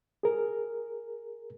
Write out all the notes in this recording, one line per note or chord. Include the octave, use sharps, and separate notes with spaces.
G#4 A#4